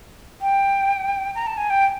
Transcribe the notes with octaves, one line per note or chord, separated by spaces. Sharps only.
G5
A#5
A5
G#5
G5